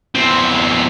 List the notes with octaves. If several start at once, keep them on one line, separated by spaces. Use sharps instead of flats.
E2 C4